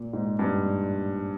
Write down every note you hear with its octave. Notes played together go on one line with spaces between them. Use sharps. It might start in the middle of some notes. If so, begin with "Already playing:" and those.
Already playing: A#2
G#2
G2